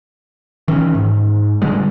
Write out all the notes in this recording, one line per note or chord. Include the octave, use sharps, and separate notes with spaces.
D#3 E3 C#4
G#2
D3 G3 G#3